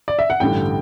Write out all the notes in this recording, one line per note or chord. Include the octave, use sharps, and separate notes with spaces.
D5
E5
F#5
A1 G2 D3 G5